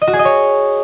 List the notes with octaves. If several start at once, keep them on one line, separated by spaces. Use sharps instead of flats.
D#5
F#4
G#4
D#5
C#5